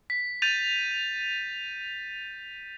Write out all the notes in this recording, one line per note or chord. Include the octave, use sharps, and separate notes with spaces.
B6
G6 A6 D#7 F7